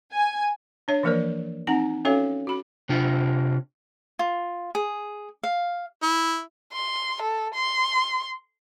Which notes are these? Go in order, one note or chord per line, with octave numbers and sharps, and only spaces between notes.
G#5
D4 C#5 E5
E3 F3 A#3 A#4 C5 D5
C4 D#4 F#5 A#5
C#4 F#4 A4 C#5 E5 F5
F#4 B5
C3 D4 F4
F4
G#4
F5
E4
C6
A4
C6